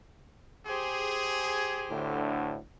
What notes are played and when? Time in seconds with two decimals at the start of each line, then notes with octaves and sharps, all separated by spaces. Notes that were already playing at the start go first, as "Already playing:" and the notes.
0.66 G4 G#4 C5
1.91 D2 A2 D3